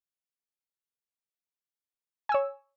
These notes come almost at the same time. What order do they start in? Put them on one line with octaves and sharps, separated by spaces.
G#5 E6 C#5